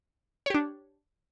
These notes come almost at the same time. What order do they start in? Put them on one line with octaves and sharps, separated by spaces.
C#5 G4 D4